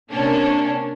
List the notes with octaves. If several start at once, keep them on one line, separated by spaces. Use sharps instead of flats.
C3 A#3 C#4 D4